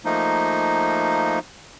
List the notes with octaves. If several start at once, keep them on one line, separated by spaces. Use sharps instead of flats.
F3 A3 A#3 D#4